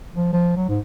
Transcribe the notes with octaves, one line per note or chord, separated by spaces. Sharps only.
F3
F3
F#3
G#2